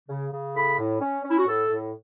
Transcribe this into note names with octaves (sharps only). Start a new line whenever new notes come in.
C#3
C#3
A2 B5
A2
C#4
C#4
E4
F#4
A2 A4
A2